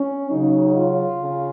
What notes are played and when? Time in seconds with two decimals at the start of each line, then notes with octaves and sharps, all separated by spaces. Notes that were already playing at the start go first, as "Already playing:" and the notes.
Already playing: C#4
0.30 C#3 F#3 D#4
0.75 F4
1.22 C#3